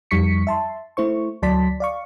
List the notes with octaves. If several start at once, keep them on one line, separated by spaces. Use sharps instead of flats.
F2 G3 D#4 C#6 B6 C#7
E5 A5 C6
A3 E4 C5 C#6
D2 F#3 D5 A5 C6 B6
D5 F5 C#6